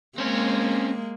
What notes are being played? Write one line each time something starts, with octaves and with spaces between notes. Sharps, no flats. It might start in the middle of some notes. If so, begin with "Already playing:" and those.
G#3 A#3 C4 C#4